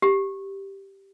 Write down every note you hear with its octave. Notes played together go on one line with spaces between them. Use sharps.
G4